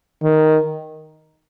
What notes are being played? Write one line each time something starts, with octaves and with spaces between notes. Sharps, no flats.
D#3